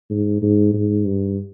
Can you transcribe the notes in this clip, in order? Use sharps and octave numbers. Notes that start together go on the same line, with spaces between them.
G#2
G#2
G#2
G2